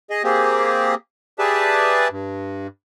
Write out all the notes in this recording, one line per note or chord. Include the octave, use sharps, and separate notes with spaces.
G#4 D#5
A#3 C4 G4 G#4
G4 G#4 B4 D5 E5 A5
G2